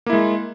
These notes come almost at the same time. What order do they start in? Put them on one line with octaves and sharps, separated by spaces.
A#3 E4 G#3